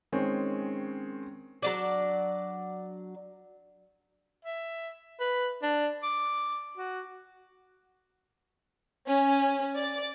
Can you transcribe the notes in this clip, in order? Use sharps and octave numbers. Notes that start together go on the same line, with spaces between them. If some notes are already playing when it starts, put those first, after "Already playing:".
D#3 G#3 C4 C#4 C#5
F#3 D4 D5
E5
B4
D4
D6
F#4
C#4
D5